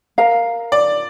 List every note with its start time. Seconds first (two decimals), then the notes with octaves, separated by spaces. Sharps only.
0.18 A#4 F5 A#5
0.72 D5